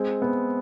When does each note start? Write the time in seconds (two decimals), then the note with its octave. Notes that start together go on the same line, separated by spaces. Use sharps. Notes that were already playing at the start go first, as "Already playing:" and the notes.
Already playing: G#3 C4
0.22 B3